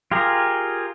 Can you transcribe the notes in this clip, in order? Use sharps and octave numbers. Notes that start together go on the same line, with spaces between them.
F4 G4 G#4 A#4